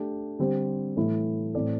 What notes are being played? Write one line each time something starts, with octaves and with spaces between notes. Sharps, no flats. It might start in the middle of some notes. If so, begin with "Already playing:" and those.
Already playing: A3 D4 G4
D3 G3 C4 G4 C5
A2 E3 A3 E4
A2 E3 C4 A4 D5